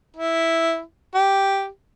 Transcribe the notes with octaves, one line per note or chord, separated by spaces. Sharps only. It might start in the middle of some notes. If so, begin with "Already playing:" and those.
E4
G4